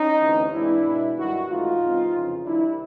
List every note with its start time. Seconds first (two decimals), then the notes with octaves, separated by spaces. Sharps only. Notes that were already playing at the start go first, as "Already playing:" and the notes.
Already playing: C#4 D#4
0.20 D2 C3 E3
0.52 G#2 E3 G#3 C4 D4 E4
0.84 B2 G#3 B3
1.16 G2 D#3 F#3 E4 F#4
1.48 G#2 E3 A3 D#4 F4
1.81 C#2 C3 E3 G#3 C4
2.13 F2 C#3 E3
2.45 C2 C3 D#3 D4 E4